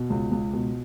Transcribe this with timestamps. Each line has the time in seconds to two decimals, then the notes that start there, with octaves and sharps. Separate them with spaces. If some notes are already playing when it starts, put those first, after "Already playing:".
Already playing: B2
0.10 C#2
0.31 C#2
0.53 B2